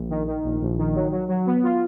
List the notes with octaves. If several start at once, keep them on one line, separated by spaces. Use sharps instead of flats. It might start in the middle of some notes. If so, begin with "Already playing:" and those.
Already playing: A#1
D#3
D#3
A#1
A#1
D#3
F#3
F#3
F#3
B3
F4